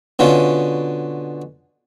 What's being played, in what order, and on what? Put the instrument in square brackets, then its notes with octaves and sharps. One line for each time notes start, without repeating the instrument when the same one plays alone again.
[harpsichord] B2 D3 C#4 F4